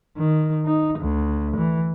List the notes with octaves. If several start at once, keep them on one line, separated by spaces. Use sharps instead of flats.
D#3
D#4
D2
E3